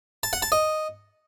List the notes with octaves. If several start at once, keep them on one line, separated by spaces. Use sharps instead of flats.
A5
F#5
A5
D#5